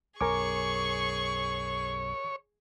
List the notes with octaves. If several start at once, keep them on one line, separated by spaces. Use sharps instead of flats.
B1 F#2 G#4 A#4 C#5 G#5 C#6 D6